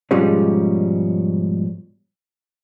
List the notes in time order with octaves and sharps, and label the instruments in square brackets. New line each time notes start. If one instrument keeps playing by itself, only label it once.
[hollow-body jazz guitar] G#2 B2 F3 G3 G#3 C#4